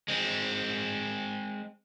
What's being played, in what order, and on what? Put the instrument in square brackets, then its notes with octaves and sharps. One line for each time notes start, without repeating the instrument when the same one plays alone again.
[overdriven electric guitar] G#3 C4